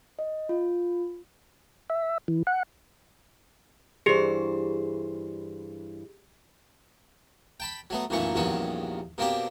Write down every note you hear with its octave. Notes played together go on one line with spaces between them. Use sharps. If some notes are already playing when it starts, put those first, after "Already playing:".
D#5
F4
E5
E3
F#5
G2 E3 G4 G#4 C5
G5 A5 B5
F#3 A3 B3
B1 F#2 A#2 E3 A3 C#6
A#1 E2 G2 D#3 C#4 F#4
B2 A#3 C4 D4 G4